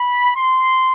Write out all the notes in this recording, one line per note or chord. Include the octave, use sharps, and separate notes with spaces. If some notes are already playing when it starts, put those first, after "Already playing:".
Already playing: B5
C6